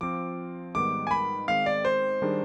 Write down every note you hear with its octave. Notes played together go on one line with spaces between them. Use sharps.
F3 C4 F4 D6
G#2 D#3 G3 B3 D6
G#5
B5
D#3 G#3 C4 F5
D5
C5
D#3 G3 D4 G#4